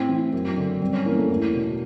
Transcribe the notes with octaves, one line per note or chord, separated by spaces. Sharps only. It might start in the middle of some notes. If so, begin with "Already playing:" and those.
Already playing: A2 C4
E3
F#2
D3
G2 C4
C#4
E3 A#3
A3
E2
B2